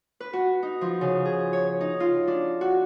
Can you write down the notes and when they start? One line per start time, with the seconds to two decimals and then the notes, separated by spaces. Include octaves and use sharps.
0.20 B4
0.33 F#4
0.63 D#4
0.81 F3
1.01 C#3
1.25 G#4
1.53 C#5
1.81 D#4
2.00 F4
2.27 D4
2.61 F#4